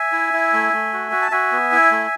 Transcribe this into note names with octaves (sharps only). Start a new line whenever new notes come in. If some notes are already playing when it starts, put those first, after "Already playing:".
Already playing: E5 G#5
E4
E4
A3
A3
F#4
F#4
A5
F#4 E5 G#5
B3
E4
A3